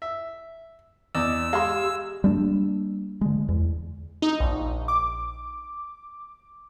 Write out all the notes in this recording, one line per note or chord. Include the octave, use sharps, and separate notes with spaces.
E5
E2 D5 D#5 E6
G#3 G4 F5 C6
G3 A#3 D4
D3 G#3
E2
D#4
A#1
D6